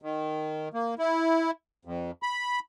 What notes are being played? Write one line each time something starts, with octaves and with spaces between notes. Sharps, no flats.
D#3
A#3
E4
F2
B5